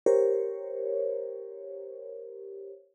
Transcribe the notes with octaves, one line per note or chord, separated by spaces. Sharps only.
G4 A#4 C5 C#5